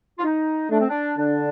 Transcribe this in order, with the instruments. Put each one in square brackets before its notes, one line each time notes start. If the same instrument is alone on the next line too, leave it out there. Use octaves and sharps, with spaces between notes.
[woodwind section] F4
D#4
[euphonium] A3 [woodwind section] D4
[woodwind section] C4
D4
[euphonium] D3 [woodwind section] D4